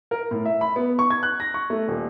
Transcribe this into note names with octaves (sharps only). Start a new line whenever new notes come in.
A#4
A2
E5
B5
B3
C#6
G#6
F#6
A#6
C#6
A3
D#1